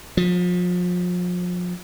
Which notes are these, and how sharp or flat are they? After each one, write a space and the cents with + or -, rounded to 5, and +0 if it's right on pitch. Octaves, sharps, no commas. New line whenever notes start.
F3 +35